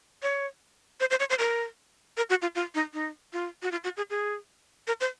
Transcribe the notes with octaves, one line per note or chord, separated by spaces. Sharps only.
C#5
C5
C5
C#5
C5
A#4
A#4
F#4
F4
F4
D#4
D#4
F4
F#4
F4
F#4
G#4
G#4
A#4
C5